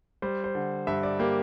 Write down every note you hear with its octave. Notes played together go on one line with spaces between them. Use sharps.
G3 C5
C5
D3
G2 E5
D5
A#3 G4